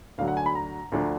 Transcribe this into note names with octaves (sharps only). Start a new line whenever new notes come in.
D2 D3 F#3 F5
F#5
G#5
B5
A#5
D2 D3 F3